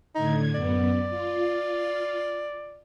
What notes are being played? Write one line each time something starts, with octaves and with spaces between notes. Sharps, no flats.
A2 D3 D#4 G#6
F#2 B3 D5
F4